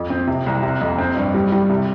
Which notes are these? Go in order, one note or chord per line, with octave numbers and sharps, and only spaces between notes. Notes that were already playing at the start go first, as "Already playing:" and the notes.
Already playing: F2
C4
C3
C2
C3
F2
C4
G2
G3
G3
C3